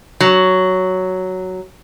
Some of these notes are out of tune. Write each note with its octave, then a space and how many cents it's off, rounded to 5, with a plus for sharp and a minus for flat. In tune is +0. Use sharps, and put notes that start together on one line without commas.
F#3 +5